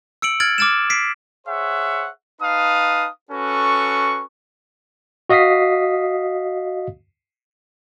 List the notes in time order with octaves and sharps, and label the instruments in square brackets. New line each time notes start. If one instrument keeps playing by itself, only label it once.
[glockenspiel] E6 C#7 D7 F#7
F6 G#6 A6 D7 F#7
D6 F6 A6 D7 E7
B6 C7 D7
[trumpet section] G#4 C5 C#5 E5 F#5
D#4 B4 F5 A5 D#6
C#4 F#4 A4 B4 C#6
[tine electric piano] F#4 D#5 F5 D#6 B6 C7